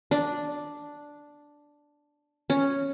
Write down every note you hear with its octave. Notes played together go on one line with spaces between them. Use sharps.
D4
C#4